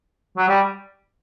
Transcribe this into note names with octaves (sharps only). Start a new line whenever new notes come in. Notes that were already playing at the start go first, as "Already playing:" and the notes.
F#3
G3